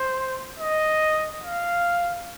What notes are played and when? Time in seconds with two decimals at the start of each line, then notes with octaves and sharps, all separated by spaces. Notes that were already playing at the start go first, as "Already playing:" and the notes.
Already playing: C5
0.59 D#5
1.41 F5